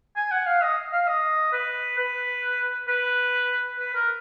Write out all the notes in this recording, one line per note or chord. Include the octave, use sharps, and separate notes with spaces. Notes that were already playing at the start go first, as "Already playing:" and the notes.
G#5
F#5
F5
D#5
F5
D#5
B4
B4
B4
B4
A#4